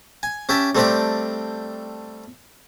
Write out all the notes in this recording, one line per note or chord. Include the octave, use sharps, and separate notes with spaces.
G#5
C#4 G4 E5 A5
G3 A3 C4 D4 G4 D5